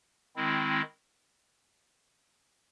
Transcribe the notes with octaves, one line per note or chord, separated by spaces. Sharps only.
D#3 G#3 C4 E4